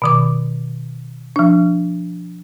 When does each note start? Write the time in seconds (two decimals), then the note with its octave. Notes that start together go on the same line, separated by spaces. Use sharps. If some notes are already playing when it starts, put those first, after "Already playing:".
0.02 B2 D#3 D6
1.36 F3 D4